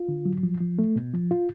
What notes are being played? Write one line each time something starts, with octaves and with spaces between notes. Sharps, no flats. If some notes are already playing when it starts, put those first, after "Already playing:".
Already playing: F4
D3
F#3
F3
F3
A3
B2
F3
F4